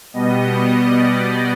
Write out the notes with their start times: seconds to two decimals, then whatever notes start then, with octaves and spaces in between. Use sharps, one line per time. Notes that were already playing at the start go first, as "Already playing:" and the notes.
0.13 B2 G3 B3 D#5
0.47 D#5
0.80 D5
1.12 D5